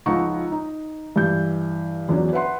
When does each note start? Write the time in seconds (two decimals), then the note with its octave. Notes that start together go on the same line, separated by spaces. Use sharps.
0.06 C#2 F3 D#4 F#5 A#5 C#6
0.52 D#4
1.16 G2 E3 G6
2.09 E2 F#3 C#4 D4
2.33 B4 E5 F#5 C6